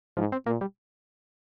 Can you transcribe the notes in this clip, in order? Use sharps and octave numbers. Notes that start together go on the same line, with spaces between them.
G#2 F3
C4
A#2 A#3
G3